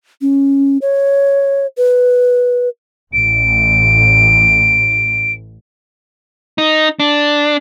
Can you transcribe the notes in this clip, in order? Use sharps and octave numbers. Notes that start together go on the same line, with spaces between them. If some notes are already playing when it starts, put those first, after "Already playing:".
C#4
C#5
B4
A1 D7
D#4
D4